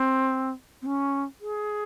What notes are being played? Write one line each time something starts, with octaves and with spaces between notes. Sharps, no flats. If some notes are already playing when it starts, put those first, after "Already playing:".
Already playing: C4
C4
C#4
G#4